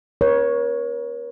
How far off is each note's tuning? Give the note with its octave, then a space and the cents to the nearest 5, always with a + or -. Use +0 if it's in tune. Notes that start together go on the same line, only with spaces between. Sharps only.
A#4 +45 C#5 +0